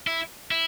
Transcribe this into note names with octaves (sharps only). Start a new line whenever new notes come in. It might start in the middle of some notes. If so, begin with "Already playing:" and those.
E4
E4